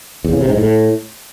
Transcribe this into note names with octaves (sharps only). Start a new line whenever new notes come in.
E2
C#3
C3
G#2
A2